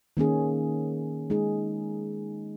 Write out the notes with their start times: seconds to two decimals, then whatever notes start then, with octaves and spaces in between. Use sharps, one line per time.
0.17 D#3 A#3 C#4 G#4
1.30 G#3 D#4 G#4